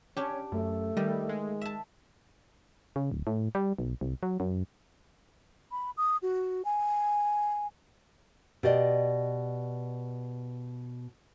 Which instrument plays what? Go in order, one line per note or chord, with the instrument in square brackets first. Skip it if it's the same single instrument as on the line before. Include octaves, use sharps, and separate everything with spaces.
[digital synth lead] C#4 [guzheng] D4 G4 [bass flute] C#5
[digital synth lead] F#2 [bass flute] A3
[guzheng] D#3 [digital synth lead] G3
[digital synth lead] G#3
[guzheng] E5 A5
[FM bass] C#3
D1
A2
G3
B1
C2
F#3
F#2
[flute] B5
D#6
F#4
G#5
[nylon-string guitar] B2 G4 D5 D#5